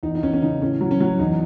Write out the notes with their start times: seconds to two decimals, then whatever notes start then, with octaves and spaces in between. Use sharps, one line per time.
0.03 E2 D#4
0.15 D#4
0.23 E2 C#4
0.33 C#4
0.42 C#3 D#4
0.61 A2 C#4
0.81 F#3
0.91 C#4
1.00 F#3
1.19 E2 D#4